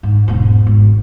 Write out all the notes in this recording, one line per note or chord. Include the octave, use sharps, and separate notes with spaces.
G#2
E1 G#2
G#1